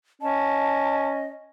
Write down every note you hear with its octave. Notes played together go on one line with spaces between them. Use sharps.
C#4 D#5 A5